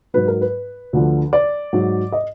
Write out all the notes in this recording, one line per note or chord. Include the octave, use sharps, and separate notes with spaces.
G#2 F#3 B4
A#4
B4
D2 D3 F3
D5
G#2 F#3
D#5